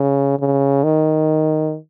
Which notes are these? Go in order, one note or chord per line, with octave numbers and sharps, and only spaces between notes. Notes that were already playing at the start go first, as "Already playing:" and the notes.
Already playing: C#3
C#3
D#3